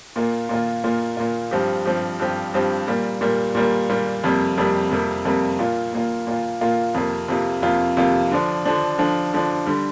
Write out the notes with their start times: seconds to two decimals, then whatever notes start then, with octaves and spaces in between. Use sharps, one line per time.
0.16 A#2 A#3 F4
0.49 A#2 A#3 F4
0.84 A#2 A#3 F4
1.17 A#2 A#3 F4
1.51 G2 F3 C4 G4
1.86 G2 F3 C4 G4
2.20 G2 F3 C4 G4
2.54 G2 F3 C4 G4
2.87 A#2 G3 A#3
3.21 A#2 G3 A#3
3.55 A#2 G3 A#3
3.90 A#2 G3 A#3
4.24 F2 C3 G3 A#3
4.58 F2 C3 G3 A#3
4.91 F2 C3 G3 A#3
5.25 F2 C3 G3 A#3
5.59 A#2 A#3 F4
5.93 A#2 A#3 F4
6.27 A#2 A#3 F4
6.61 A#2 A#3 F4
6.94 F2 C3 A#3 F4
7.28 F2 C3 A#3 F4
7.62 F2 C3 A#3 F4
7.97 F2 C3 A#3 F4
8.31 D3 F3 D4
8.65 D3 F3 D4
8.98 D3 F3 D4
9.33 D3 F3 D4
9.66 D3 G3